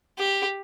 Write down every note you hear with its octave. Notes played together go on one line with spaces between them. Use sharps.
G4